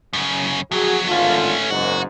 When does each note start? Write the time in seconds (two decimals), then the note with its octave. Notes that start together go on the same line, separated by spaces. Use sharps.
0.13 F#2 C#3
0.71 F2 F#3 F#4 G#4
1.08 G#1 D3 A3 C#4 F4
1.70 F#1 E2 G#2 F#4